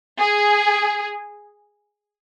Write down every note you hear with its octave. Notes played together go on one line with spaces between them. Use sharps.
G#4